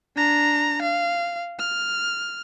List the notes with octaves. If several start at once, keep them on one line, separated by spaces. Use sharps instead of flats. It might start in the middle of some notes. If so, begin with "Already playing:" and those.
D4 A#5
F5
F6